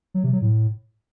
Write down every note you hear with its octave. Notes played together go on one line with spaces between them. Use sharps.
F#3
C3
F#3
A2